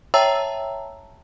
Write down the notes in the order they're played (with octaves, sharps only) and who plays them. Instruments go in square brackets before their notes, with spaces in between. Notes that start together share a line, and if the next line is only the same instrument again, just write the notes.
[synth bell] C#5 E5 G5 A5 A#5 E6